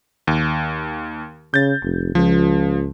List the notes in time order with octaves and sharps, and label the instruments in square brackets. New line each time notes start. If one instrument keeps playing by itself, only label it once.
[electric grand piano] D#2
[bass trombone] C#3 [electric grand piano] G6 A6
[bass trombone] F1
[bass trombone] C#2 [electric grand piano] F3